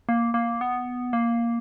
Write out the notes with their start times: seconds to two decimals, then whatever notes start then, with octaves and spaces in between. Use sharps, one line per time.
0.09 A#3
0.34 A#3
0.61 B3
1.13 A#3